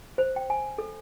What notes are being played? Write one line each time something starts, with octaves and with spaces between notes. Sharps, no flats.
C5
G5
G#5
A4